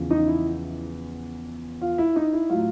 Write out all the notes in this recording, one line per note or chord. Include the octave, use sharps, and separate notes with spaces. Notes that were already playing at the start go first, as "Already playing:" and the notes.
Already playing: E2 C#3 F3
D#4
E4
F4
E4
D#4
E4
A2 F#3 F4